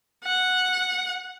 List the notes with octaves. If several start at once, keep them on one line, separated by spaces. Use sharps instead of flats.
F#5